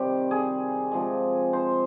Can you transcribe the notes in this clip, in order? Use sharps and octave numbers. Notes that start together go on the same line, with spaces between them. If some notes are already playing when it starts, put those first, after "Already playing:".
Already playing: C3 D#3 G3 C4 G4
G#4
C3 F3 G#3
C5